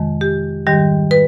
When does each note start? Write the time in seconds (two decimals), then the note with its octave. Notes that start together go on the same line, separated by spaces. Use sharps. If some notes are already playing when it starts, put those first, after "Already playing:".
Already playing: F2 C3 D#3 G#3
0.21 G4
0.67 G#2 D#3 G3 G4
1.11 B4